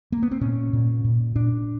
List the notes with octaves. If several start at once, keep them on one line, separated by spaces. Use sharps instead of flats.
A#3
B3
C4
A#2 C#4
A#2
A#2
A#2 D4